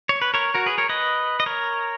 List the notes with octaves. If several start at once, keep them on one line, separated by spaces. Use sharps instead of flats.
C#5
B4
A#4 C#5
F#4 A#4
G#4 B4
A#4 C#5
B4 D#5
D#5
A#4 C#5